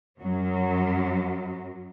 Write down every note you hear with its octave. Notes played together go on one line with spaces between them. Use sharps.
F#2 F#3